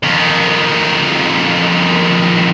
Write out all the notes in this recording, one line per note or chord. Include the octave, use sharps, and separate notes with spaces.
F2 D#3